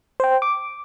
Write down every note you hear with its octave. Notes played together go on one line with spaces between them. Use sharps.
C5 G5
D6